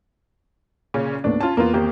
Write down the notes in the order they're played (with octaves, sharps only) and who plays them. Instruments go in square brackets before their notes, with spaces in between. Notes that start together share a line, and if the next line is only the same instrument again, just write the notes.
[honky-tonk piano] A#2 C#3 C#4
[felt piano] D#2 A2 B3 [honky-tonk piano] D4
[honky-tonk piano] C#4 F4 [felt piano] A5
[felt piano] E2 [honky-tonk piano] A#3 B3 F4
[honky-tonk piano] G#1 A#3 G4